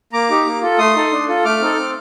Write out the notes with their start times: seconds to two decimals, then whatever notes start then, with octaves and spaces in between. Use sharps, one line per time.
0.13 A#3 A#5 D6
0.30 D#4 G4
0.46 A#3
0.62 F4 A4
0.78 A3 C6 D#6
0.96 D#4 A4
1.12 D4
1.28 F4 A4
1.45 A3 D6 F6
1.61 C4 D#4 A4
1.78 C4